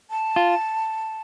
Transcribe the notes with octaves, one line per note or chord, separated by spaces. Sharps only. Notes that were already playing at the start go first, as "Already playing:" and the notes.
A5
F4